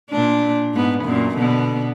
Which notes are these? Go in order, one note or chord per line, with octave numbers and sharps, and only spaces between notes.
A#2 D4
G#2 B3
F#2 A#2
B2 D3 B3